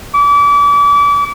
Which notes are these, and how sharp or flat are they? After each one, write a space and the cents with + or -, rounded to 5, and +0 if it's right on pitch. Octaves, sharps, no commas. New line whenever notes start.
D6 -35